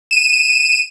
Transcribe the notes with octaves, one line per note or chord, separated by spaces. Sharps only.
D#7 E7